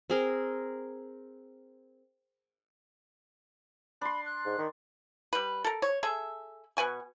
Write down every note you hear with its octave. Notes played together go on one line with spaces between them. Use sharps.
C4 G#4 A#4
D4 B5 C6
F#6
G#2
D#3
G3 B4
A4 A#4
C#5
G#4 A4 E5
B2 B4 G#5 C#6